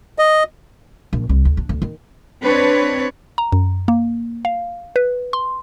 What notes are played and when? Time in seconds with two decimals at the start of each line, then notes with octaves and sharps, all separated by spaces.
0.19 D#5
1.13 A#1
1.29 C2
1.45 D2
1.57 D4
1.69 D2
1.82 D#3
2.43 C4 D4 B4 C#5
3.38 A#5
3.52 F#2
3.88 A#3
4.45 F5
4.96 B4
5.33 C6